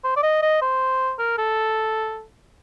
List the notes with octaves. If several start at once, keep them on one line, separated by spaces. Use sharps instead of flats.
C5
D5
D#5
D#5
C5
A#4
A4